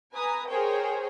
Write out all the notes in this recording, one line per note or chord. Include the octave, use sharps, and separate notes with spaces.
B4 G#5 A#5 D#6
G#4 A#4 C5 C#5 G5